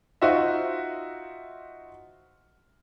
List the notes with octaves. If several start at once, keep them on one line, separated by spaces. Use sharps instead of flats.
D#4 F4 F#4 C5 D#5 E5